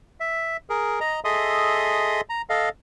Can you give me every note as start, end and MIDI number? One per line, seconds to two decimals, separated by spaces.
0.20 0.57 76
0.70 1.00 68
0.70 1.00 70
1.00 1.20 75
1.00 1.20 82
1.25 2.21 68
1.25 2.21 69
1.25 2.21 75
1.25 2.21 76
1.25 2.21 84
1.25 2.21 87
2.29 2.42 82
2.50 2.69 69
2.50 2.69 75
2.50 2.69 77